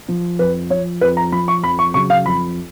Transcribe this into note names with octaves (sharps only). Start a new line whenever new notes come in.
F3
F2 B4
F3 C#5
F2 B4
A#5
F3 B5
C#6
F2 B5
C#6
C#3 F#3 C#6
F5
F2 B5